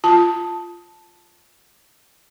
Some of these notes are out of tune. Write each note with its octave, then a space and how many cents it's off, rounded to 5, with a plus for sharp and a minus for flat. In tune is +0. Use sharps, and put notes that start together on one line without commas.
F4 +0 A5 +0